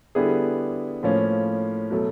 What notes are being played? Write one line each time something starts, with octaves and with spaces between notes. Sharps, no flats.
D3 G3 B3 E4 G#4
A2 F3 A#3 C#4
B2 F#3 A3